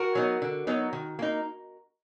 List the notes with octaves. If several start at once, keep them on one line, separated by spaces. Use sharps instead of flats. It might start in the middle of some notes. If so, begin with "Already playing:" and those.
Already playing: F#4 A#4
F#3 B3 D#4
D3
F#3 B3 D#4
D#3
A#3 D#4